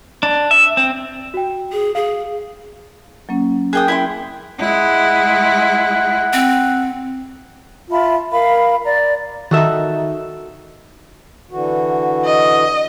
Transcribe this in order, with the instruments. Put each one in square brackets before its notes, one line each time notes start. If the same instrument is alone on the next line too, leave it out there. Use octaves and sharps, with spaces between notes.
[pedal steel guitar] D4
E5
C4
[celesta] F#4 G5
[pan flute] G#4
[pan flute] G#4 [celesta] F5
[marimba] F#3 A#3 C#4
[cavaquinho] G#4 G5 D#6 [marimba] A#4 F#6
[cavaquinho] E4 G5 C6
[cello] G#3 E4 [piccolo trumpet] F#5
[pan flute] C4
[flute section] F4 E5 A5 B5
A#4 F5 B5
D5 A#5
[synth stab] D#3 D#4 [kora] F#4 A4 E5
[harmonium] D3 E3 F#4
[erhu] D#5